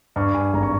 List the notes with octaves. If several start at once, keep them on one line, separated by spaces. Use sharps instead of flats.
G2 C#6
G#5
G#1 A#5
C#6